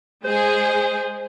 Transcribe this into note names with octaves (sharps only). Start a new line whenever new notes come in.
G#3 G#4 C5